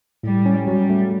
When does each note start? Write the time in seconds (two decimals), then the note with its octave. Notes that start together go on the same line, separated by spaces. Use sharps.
0.23 A2 G3
0.46 C#4
0.67 F#3 G3
0.89 A3